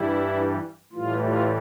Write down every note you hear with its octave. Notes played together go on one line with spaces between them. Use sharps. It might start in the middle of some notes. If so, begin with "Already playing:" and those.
Already playing: G2 E3 G3 E4
A2 E3 G3 F4
F4